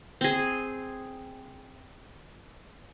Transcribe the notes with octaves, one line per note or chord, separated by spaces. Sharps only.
C4 G#4